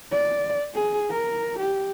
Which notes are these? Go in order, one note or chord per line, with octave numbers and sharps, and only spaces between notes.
D5
G#4
A#4
G4